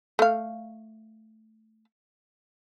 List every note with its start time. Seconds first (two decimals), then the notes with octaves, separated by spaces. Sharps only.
0.19 A3 F5